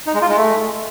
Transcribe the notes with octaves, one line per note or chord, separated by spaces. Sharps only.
D#4
G#3
F4
G#3
A3